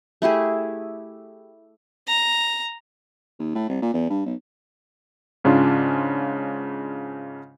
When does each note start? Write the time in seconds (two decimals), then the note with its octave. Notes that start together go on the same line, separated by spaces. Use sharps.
0.22 A3 E4 G4 G#4
2.07 A#5
3.39 D#2
3.55 A2
3.69 C2
3.82 A#2
3.94 E2
4.09 G2
4.26 B1
5.44 G#2 C#3 C#4 D4 F4